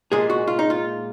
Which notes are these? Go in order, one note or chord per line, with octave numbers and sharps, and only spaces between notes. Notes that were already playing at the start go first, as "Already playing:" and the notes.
A#2 G#3 G#4
F#4
F4
D#4
F4